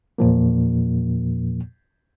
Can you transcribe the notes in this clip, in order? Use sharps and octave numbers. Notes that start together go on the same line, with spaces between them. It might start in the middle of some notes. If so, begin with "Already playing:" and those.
E2 A#2 F3 A#3